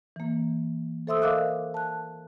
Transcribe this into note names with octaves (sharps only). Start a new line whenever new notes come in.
E3 A#3
A4 C5 E5 C6 D#6 E6
A#4 D#5 F5 D6 E6 F#6
A5 F#6